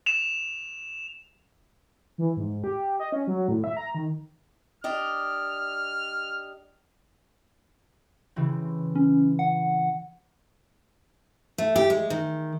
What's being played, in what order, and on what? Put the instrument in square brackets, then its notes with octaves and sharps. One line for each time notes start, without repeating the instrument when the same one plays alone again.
[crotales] E7 F7
[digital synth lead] E3
G#2
G4
D#5
C#4
F#3
A2
E5
A#5
D#3
[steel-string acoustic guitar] D4 G4 D#5 [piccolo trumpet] F6
[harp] C#3 E3 C4
[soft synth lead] C#4
F#5
[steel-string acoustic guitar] A3
G4
G#3
D#3